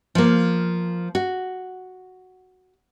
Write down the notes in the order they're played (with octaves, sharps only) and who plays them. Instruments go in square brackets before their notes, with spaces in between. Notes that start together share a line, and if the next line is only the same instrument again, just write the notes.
[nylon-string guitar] F3 A#3
F#4